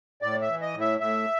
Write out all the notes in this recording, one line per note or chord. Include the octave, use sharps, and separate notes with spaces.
A2 D5
E5
E3
D#5
A2
E5
A2 E5